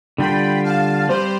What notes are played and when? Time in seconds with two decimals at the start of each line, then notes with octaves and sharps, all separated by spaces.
0.18 D3 G3 D4 F4 G5 B5
0.64 F5 A5
1.09 G3 C4 G4 B4 C5